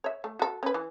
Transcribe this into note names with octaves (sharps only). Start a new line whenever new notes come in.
C#5 E5
A3
F#4 A4
C#4 B4
E3